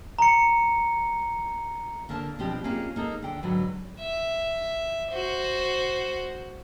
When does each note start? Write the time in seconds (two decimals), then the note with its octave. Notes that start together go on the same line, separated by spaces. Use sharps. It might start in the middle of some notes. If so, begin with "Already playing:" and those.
0.19 A#5 C#7
2.09 D3 A#3 A#4 A5
2.39 B2 F3 C4 D4 G4
2.64 A#3 C#4 D#4 F4 G4 G#4
2.96 A#3 D#4 A4
3.22 D3 G5
3.43 G#2 D3 F#3 B4
3.99 E5
5.11 F#4 C5